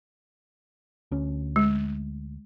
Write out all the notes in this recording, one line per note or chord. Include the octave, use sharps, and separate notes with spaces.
D2 C#4
G#3